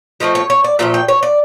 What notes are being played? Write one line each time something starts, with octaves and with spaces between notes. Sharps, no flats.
F3 A3 C4 D#5
C#5
C#5
D5
A#2 F3 A3 E5
G5
C#5
D5